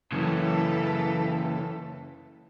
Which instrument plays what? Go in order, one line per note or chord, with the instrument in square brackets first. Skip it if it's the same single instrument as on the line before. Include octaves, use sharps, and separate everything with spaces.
[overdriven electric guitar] F#2 C#3 [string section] E3 A4